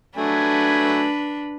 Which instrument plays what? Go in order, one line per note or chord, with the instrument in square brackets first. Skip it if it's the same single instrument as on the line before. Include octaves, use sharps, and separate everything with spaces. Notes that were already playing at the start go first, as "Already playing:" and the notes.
[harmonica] F#3 A3 G#5 [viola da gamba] D4 B4